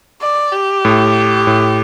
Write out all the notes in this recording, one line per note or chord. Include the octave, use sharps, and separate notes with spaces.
D5
G4
A2
A2